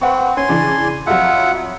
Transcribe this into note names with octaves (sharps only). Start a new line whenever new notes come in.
C4 B4 F#5 C#6
C#4 G#5 C6
C#3 E3 D4
F2 F#3 F4 E5 F#5